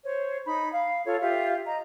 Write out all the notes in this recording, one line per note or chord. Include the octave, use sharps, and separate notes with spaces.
C5 C#5
D#4 B5
F5
F4 A4 C#5
F4 G4 E5
D#5 A#5